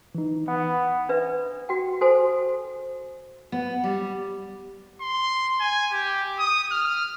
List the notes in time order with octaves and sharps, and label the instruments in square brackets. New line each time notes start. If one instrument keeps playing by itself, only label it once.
[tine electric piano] E3 D#4
[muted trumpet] B3 [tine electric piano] F#5
[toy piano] D4 B4 E5
F#4 G5
F#4 A4 C5 G#5
[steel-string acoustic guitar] B3
G3
[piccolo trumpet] C6
G#5
G4
D#6
F6